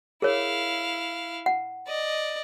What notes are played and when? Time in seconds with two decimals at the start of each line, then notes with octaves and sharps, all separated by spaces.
0.22 E4 G#4 A#4 C#5 F5
1.46 F#5
1.87 D5 D#5